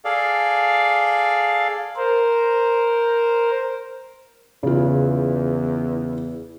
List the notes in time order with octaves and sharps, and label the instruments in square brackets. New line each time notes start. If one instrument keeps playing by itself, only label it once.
[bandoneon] G#4 A4 D5 F5
[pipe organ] A#4 C5
[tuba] E2 [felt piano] C#3 F4